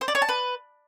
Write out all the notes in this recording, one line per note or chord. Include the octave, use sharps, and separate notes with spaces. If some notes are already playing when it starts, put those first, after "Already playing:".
C5
D5
C#5
A5
B4